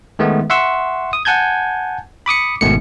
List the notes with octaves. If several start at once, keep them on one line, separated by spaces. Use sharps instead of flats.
D#3 G#3 A3 B3
E5 F#5 C6 C#6 E6
D#6
F#5 G#5 A5 G6 G#6
B5 D6 D#6 C#7
G#1 G#2 B2 D#3 A3 C#7